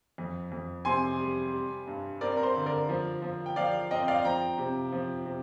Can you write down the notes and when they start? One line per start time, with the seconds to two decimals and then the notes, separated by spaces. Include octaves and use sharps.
0.18 F2
0.52 F2
0.85 C3 G#5 C6
1.19 G3
1.53 G3
1.87 G2
2.21 C4 A#4 D5
2.37 A#4
2.43 C5
2.56 D3
2.66 A#4 D5
2.89 F3
3.22 F3
3.46 G5
3.56 F3 D5 F5
3.91 C4 D#5 G5
4.08 D5 F5
4.24 F3 G5 A#5
4.58 C3
4.92 F3
5.26 C3